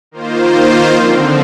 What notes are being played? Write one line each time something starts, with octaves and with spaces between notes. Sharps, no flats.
D#3 A#3 F4 C5
D3 F3 C4